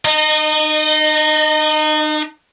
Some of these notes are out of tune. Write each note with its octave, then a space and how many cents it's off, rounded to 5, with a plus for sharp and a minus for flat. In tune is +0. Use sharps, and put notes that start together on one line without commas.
D#4 -35 D#5 -15